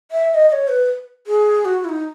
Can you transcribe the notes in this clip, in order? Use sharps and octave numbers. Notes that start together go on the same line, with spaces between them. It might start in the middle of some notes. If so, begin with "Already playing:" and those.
E5
E5
D#5
D#5
C#5
B4
G#4
F#4
E4
D#4